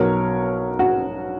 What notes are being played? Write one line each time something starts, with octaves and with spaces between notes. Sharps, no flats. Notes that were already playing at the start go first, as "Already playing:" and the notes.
Already playing: B1 B2 F#3 A#4 C#5
F#4